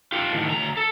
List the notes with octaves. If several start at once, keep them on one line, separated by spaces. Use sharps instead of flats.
F4 G4
A2 D#3
D2 A#5
A4